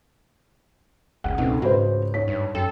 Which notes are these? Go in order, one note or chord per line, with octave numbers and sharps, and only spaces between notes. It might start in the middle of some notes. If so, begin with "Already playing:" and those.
F#1 C#2 F#5
C#2 B2 A3 C4 D#4
G#2 F#4 B4 C5
D#4 C#5 B6
G2
F#2 A4 G5